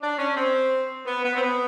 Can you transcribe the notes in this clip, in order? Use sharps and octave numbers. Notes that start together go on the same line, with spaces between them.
D4
C#4
C4
B3
B3
C4
B3